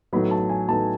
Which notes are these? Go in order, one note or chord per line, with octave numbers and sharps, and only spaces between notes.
A2 F#3 B3 D#4 B5
A5
G#5
A2 F#3 B3 D#4 A5